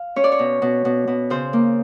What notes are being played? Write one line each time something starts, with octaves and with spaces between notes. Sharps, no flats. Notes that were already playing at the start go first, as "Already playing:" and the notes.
Already playing: F5
C#4 C#5
D5
C#5
B2
B2
B2
B2
C#3 C5
A#3